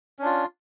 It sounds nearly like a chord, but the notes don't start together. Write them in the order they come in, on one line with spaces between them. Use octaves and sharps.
C#4 D4 F4